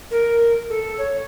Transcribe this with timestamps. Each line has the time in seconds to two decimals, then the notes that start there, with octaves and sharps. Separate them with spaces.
0.10 A#4
0.69 A4
0.97 C#5